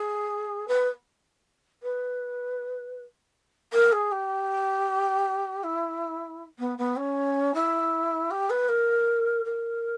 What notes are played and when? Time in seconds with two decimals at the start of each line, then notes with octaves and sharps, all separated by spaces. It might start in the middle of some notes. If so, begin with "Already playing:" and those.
Already playing: G#4
0.68 B4
1.83 B4
3.73 A#4
3.92 G#4
4.12 G4
5.64 E4
6.59 B3
6.78 B3
6.97 C#4
7.54 E4
8.31 G4
8.50 B4
8.69 A#4
9.45 A#4